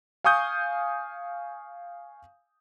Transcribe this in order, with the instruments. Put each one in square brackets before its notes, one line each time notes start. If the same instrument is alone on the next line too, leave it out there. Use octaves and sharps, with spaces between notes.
[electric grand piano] F5 G#5 C#6 D#6 G6